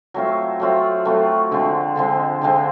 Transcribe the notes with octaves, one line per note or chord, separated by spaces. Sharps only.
F#3 A3 C4 F4
F#3 A3 C4 F4
F#3 A3 C4 F4
D3 F3 G#3 C4
D3 F3 G#3 C4
D3 F3 G#3 C4